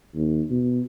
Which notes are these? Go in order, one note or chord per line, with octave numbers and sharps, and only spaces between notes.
D#2
B2